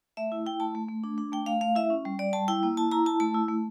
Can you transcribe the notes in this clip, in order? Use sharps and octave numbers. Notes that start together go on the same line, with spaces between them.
A3 E5
E4
E4 G5
A3 A5
A3
A3
D4
D4
A3 G5
A3 F5
A3 F5
E4 E5
C#4
G3
G3 D5
G3 A5
E4 G5
A#3
E4 A5
E4 A#5
E4 A5
A3 A5
E4
A3